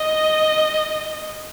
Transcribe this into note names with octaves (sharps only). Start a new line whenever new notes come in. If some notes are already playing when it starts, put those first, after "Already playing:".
Already playing: D#5